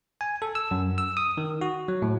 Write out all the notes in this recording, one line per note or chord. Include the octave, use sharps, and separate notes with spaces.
G#5
A4
E6
F#2
E6
D#6
D#3
F#4
F#3
A2